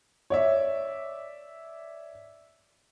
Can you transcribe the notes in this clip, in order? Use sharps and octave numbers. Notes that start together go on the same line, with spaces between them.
C#5 D5 E5